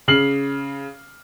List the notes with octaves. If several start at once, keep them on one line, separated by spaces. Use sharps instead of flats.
C#3 F6 C7 F#7